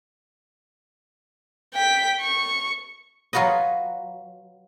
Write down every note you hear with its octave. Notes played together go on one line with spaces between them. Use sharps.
G5 B6
C#6
F#3 F4 F#4 B4 D#5